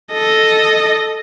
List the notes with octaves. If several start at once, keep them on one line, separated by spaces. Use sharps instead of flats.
A4 D#5